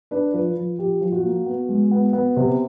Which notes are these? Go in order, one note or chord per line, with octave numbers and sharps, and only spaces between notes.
D4 B4
F3 B4
F3
F3 G4
F3
F#4
A#3
B3
G#3
B3
B3
C3